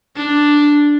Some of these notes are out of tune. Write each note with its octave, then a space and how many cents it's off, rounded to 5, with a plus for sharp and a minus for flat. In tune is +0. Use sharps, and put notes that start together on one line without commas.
D4 +0